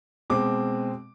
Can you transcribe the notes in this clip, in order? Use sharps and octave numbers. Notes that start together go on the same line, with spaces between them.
B2 G#3 C4 D6